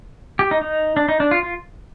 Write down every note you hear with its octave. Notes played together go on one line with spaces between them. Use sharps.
G4
D#4
D#4
D4
D#4
D4
F4
F4